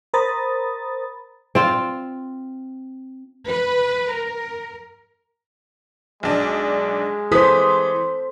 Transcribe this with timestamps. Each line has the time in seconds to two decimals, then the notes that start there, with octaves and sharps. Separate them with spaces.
0.14 A#4 C5 A#5 B5 D#6 A6
1.55 C4 F4
3.47 B4
4.13 A#4
6.23 B1 G#3 D4
7.32 E3 A4 C5 D#6 B6